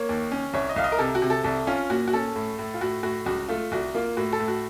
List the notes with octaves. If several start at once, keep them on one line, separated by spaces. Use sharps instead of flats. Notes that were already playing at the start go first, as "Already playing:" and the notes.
Already playing: A#3 C#5
D#2
C#4
C2 C#5
D#5
C2 F5
D#5
A#4
C3 A4
F#4
C3
A4
C2 A4
C#4 F4
A#2 F#4
F#4
C#4 A4
A2
A2
F4
A2 F#4
A2 F#4
C#2 F#4
A3 F4
C2 F#4
A#3 F4
A2 F#4
A4
A2
F#4